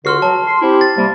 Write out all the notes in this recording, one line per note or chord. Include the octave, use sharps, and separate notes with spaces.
C#2 D3 F#4 C6 F6 C7
F#3 A5
C6
C4 E4 G4
A6
C3 G3 A#3